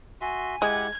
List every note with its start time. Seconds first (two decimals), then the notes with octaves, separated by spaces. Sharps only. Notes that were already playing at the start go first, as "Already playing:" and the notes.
0.21 F#4 E5 G#5 C6
0.62 G#3 E4 G4 F#5 G#6